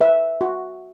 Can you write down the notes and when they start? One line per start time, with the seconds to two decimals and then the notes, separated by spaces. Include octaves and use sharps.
0.01 B4 E5
0.41 F#4